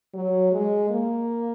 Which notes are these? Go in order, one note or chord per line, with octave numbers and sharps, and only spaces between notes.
F#3
G#3
A#3